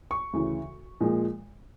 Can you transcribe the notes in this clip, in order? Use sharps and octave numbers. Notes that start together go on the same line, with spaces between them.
C#6
D2 C#3 E3
A#2 F3 G#3